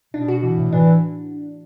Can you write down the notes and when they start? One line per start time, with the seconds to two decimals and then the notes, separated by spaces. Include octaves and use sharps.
0.14 B2 D4
0.28 F#4
0.43 B2 E3
0.58 A2
0.73 E3 D4